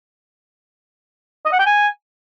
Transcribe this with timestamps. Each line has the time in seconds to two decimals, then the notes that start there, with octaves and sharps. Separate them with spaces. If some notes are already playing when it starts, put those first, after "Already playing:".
1.46 D#5
1.53 F#5
1.59 G5
1.66 G#5